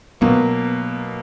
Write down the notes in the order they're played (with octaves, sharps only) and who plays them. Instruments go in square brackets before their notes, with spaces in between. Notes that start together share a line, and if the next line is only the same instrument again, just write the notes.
[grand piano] B2 F#3 A#3 [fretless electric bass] B3